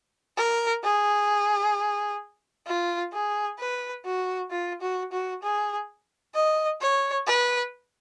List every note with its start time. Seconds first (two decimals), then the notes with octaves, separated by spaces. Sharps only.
0.37 A#4
0.83 G#4
2.67 F4
3.13 G#4
3.59 B4
4.05 F#4
4.51 F4
4.81 F#4
5.12 F#4
5.43 G#4
6.35 D#5
6.81 C#5
7.27 B4